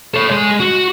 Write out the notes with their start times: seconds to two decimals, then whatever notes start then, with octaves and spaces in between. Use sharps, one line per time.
0.14 A4 C#5
0.31 G#3
0.60 F#4